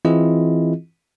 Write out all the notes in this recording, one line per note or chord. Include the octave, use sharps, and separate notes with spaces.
E3 C4 E4 F4 G#4 D#5